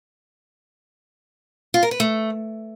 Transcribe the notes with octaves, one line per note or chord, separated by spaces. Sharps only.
F4
A#4
B4
A3